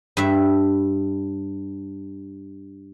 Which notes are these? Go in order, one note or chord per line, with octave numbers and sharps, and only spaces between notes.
G2 E5